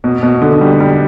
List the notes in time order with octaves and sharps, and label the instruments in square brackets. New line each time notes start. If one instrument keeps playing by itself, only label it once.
[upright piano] B2
B2
D3
G3
G3